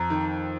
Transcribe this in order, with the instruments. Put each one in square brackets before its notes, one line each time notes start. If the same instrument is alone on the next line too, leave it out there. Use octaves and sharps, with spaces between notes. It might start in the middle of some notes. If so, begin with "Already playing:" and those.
Already playing: [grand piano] F2 [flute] A#5
[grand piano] D#3